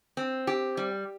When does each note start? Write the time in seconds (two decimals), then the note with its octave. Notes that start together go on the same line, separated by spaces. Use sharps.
0.17 C4
0.47 G4
0.77 G3